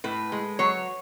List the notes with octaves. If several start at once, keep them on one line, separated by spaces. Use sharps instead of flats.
A2 B4
G#3
F#3 C#5